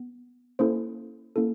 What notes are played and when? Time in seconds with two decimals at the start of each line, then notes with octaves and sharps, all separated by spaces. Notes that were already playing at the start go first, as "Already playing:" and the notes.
Already playing: B3
0.59 A#3 C#4 E4 A4 C5
1.36 A#3 C#4 E4 A4